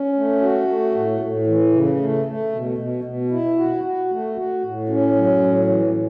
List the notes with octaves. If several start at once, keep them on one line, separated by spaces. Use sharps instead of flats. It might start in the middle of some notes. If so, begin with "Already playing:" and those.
Already playing: C#4
A3
F#4
A3
A2
A2
E3
C#3
A3
A3
B2
B2
B2
E4
F#4
F#4
A3
F#4
A2
C#4
F#3
A2
E3